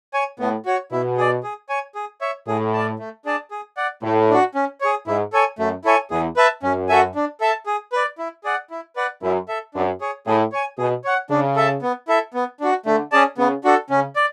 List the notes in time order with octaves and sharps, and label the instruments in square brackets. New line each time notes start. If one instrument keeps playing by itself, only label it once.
[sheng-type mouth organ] C#5 G#5
[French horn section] A2 [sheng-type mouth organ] B3
[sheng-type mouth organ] F#4 C#5
[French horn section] B2 [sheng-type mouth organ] E4
[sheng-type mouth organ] G#4 D5
G#4
C#5 G#5
G#4
C#5 E5
[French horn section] A2 [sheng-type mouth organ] G#4
[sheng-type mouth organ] D5 A5
A3
D4 G#4 D5 A5
G#4
D5 F#5
[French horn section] A2 [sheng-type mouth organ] A3
[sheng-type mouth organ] D4 F#4
C#4
G#4 C#5
[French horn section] G#2 [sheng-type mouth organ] E4
[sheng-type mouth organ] A4 C#5 G#5
[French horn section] F#2 [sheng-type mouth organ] A3
[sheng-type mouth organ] E4 A4 C#5 G#5
[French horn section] E2 [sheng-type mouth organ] G#4
[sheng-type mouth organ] B4 E5 A5
[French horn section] F#2 [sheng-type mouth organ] C#4
[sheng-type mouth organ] F#4 A4 E5 G#5
D4
A4 E5 A5
G#4
B4 D5
E4
G#4 D5 F#5
E4
B4 D5 F#5
[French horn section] F#2 [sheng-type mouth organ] E4
[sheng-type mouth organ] A4 E5
[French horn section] F#2 [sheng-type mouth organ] D4
[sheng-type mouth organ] G#4 C#5
[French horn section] A2 [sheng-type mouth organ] G#4
[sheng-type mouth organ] C#5 G#5
[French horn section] B2 [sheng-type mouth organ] G#4
[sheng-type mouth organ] C#5 F#5
[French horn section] C#3 [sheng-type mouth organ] D4
[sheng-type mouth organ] A4 E5 A5
B3
E4 A4 E5
B3
D4 F#4
[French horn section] D3 [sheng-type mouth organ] A3
[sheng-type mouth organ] C#4 G#4 D5 A5
[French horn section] C#3 [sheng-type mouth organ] B3
[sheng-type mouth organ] D4 F#4 A4
[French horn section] C#3 [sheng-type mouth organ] C#4
[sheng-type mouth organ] D5